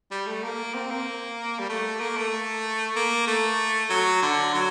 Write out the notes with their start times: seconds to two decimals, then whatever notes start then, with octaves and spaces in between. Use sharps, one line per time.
0.11 G3
0.27 A3
0.43 A#3
0.74 C4
0.90 A#3
1.59 G3
1.69 A3
2.00 A#3
2.17 A3
2.96 A#3
3.27 A3
3.90 F#3
4.22 D3
4.54 F#3